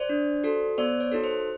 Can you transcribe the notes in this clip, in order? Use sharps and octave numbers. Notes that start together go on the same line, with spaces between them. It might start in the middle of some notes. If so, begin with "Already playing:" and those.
Already playing: C5 D5
D4
F#4 A4
B3 C5 D5
C#5
D#4 F#4 A4
C5